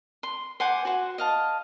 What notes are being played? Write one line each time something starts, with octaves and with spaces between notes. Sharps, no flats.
C6
C5 F#5 G#5 D6
F#4 C5
D#5 F5 A5